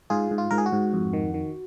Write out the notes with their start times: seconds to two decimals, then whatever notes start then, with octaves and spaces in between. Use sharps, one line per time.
0.10 G#2 F4 G#4
0.31 G#2
0.38 F4
0.51 G#2 A#4
0.58 G#4
0.66 F#4
0.72 G#2
0.93 F2
1.13 D#3
1.34 D#3